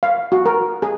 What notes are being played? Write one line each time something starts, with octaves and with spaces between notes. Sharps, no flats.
F5
F#4
A#4
G#4